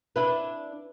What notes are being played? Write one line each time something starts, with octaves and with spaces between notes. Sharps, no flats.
D4 E4 B4